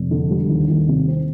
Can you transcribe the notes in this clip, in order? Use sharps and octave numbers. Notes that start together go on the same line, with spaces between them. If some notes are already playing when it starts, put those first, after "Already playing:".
Already playing: F1
D3
G3
D#2
D#2
C3
C4